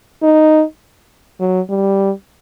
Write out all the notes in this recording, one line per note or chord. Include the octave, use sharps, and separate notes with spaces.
D#4
F#3
G3